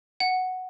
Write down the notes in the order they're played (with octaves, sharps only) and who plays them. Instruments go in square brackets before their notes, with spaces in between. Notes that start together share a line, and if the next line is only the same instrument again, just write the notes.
[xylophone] F#5